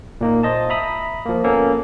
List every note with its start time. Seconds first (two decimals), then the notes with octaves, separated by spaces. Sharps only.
0.21 A#2 A#3 D#4
0.43 C5 D#5 A5
0.70 E5 A#5 B5 D#6
1.26 F3 A#3
1.44 A#3 B3 C#4 A4